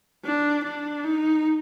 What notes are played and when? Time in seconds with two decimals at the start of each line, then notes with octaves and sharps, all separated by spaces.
0.25 D4
0.64 D4
1.04 D#4